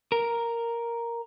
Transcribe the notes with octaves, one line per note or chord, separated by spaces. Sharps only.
A#4